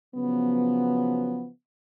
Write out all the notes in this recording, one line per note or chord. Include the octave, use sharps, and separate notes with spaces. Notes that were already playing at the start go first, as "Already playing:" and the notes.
C#3 F3 F#3 B3